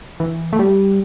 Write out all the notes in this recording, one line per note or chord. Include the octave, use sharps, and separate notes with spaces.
E3
A3
G3